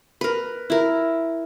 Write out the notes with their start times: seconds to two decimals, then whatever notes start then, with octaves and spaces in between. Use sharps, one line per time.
0.21 A#4 B4
0.70 E4 A#4